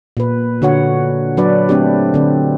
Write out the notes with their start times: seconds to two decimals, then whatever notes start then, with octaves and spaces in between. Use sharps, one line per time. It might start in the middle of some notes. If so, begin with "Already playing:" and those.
0.17 A#2 B4
0.62 D3 F#4 C#5 F#5
1.37 F#3 D4 B4 D5
1.69 A3 C4 D4 G4
2.14 D3 C4